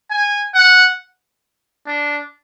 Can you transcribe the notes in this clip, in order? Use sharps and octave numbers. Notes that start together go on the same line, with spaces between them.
G#5
F#5
D4